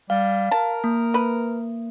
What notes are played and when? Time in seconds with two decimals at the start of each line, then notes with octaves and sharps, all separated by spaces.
0.10 G3 F5
0.51 A#4 A5
0.84 A#3
1.14 B4